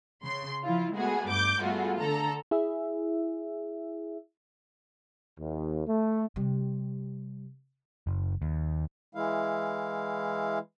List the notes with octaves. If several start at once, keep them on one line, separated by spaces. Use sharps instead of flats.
C#3 C6
F3 E4 F4
G#3 A3 B3 F#4 G#4
G2 D6 G6
G3 A3 B3 F4 F#4 G#4
D3 A4 A#5
E4 G#4 E5
D#2
A3
C3 G3
F#1
D#2
E3 G#3 E4 F5